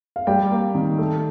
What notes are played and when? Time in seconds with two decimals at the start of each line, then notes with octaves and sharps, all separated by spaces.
0.16 F5
0.27 G3 G5
0.51 A#3
0.75 D#3
0.98 A3